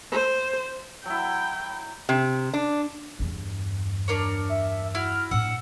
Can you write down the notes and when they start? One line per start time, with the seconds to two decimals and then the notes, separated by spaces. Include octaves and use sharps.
0.12 C5
1.06 F#3 E4 G5
2.09 C3
2.54 D4
3.19 E2 G2
4.08 D4 A#4 C#5
4.49 E5
4.95 E4 F#4 F6
5.31 A2 D4 F#5 E6